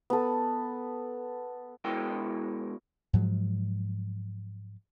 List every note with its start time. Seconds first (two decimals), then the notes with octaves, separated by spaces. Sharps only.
0.10 B3 A4
1.84 B2 G#3 E4 A#4 G5
3.13 G#2 F3 F#3 G#3